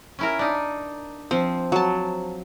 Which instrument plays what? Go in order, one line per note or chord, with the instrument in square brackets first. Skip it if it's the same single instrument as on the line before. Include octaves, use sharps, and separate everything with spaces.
[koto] C#4 E4 A#4
D4 D#4
[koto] F3 [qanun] C4
[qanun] F#3 A5